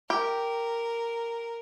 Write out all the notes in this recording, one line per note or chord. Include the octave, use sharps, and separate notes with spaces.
G4 A#4